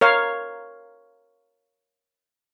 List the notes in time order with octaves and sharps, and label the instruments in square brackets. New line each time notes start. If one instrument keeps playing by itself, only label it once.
[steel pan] A#4 C#5 F5